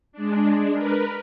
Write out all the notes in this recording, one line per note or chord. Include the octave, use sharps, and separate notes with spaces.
G#3 D4
A#4 B4